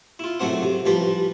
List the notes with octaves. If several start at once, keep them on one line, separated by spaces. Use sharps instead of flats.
E4 F4
C#2 A2 F#3 A3 C4 F#5
C3
A1 F3 G3 B4 A#5 C6